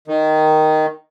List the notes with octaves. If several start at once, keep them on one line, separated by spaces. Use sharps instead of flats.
D#3